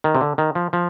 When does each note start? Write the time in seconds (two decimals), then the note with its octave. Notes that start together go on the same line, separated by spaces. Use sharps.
0.04 D#3
0.15 C3
0.21 D3
0.38 D#3
0.55 F3
0.73 F3